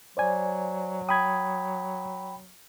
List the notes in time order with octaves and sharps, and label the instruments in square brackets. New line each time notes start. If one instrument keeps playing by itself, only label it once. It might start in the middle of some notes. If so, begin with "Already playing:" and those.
[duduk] F#3 [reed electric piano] C5 D5 G#5
[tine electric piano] G5 B5 [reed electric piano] D#6 G#6